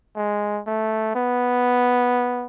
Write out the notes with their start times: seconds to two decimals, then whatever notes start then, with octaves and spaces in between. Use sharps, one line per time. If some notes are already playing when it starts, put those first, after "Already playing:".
0.17 G#3
0.67 A3
1.15 B3